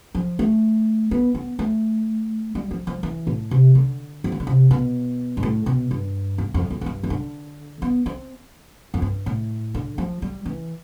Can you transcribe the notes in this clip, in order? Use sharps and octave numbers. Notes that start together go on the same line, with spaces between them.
F3
A3
B3
B3
A3
G3
F3
F3
E3
A2
C3
D3
F3
E3
D3
C3
B2
G2
A2
B2
G2
E2
F2
F2
F2
G2
E3
D3
B3
C4
F2
G2
A2
D3
F3
G3
E3